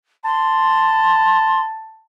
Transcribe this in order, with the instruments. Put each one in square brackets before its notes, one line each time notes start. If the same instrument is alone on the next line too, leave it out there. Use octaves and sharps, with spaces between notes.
[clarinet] A5 [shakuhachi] C6